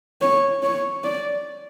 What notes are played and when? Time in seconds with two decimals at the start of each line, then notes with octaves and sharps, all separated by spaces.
0.21 C#5
0.63 C#5
1.04 D5